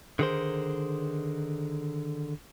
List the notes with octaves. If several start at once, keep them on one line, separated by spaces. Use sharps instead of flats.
D3 D#3 G#4 A#4 C5